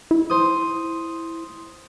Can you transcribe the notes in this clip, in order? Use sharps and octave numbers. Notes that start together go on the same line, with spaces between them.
E4
C5 D#6